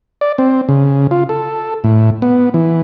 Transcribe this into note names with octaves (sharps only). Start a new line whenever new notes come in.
D5
C4
C#3
F4
A4
A2
B3
E3